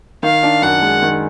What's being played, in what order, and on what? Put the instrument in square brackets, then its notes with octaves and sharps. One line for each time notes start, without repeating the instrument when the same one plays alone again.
[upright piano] D#3 [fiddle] F5
[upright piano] D4
[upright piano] F#2 [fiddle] F#5
[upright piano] G#3
D#3